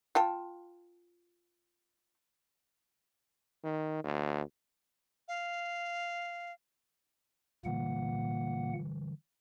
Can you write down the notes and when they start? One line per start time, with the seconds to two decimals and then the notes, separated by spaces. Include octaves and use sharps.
0.15 F4 G5 A5
3.64 D#3
4.04 D2
5.28 F5
7.65 A#2 D3 E3 G3 A#3 F#5